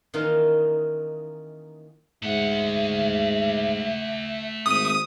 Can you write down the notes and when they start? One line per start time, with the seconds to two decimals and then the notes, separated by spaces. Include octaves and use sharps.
0.14 D#3 E3 A#3 C#4 D#4 F4
2.23 G#2 A3 E5 F#5
4.66 G#1 D#6